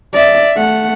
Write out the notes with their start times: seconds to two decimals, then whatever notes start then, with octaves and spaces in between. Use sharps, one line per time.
0.13 D5 E5
0.57 A3 F#5